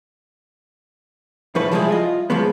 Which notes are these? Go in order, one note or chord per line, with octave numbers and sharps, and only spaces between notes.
B1 A#2 F3 E4 B4 C#5
F3 G3 G#3 B3 E4 G#4
F4 D#5
F#2 F3 F#3 G#3 B3